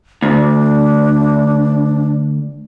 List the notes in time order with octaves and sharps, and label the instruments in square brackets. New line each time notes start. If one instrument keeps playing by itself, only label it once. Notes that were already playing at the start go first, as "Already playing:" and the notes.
[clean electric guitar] D2 [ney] D4